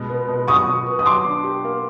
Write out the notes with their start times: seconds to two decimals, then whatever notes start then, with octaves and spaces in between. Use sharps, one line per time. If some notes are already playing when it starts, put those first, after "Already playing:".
Already playing: B2 G#3
0.09 B3
0.28 B2
0.47 F#3 C#6 D#6
0.67 B2
0.86 B3
0.99 D#6
1.05 F#3 C6 D6
1.25 D4
1.44 G4
1.64 A#3